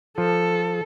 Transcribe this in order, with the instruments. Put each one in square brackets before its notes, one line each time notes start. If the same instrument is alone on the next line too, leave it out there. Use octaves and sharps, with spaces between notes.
[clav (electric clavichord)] F3 [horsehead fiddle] A4